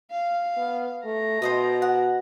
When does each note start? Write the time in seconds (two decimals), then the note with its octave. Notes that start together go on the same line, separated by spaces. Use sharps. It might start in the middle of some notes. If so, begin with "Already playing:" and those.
0.11 F5
0.57 B3
1.05 A3 A#5
1.42 B2 C5 D#5 D#6
1.82 F#5